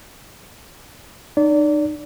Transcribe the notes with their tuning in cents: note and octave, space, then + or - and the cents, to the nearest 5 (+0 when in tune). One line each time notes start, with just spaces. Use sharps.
D#4 -40 D5 -25